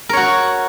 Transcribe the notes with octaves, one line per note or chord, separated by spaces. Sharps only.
F#4 A#4 C#5